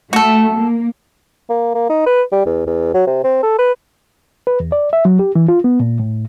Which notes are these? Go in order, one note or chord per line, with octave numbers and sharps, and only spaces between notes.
A3 F#4 A4
A#3
A#3
A#3
D#4
B4
G3
E2
E2
F#3
C3
C4
A4
B4
B4
E2
D5
E5
F#3
G4
E3
F4
B3
A#2
A2